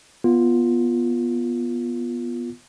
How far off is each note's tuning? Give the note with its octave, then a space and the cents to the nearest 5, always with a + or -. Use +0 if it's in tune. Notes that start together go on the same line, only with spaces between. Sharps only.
B3 -15 F4 -5